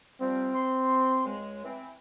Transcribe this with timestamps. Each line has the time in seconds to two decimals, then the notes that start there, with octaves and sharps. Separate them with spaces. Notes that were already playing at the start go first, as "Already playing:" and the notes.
0.21 C3 F3 G3 C4
0.55 C6
1.25 C#2 C#3 G#3
1.64 E3 C4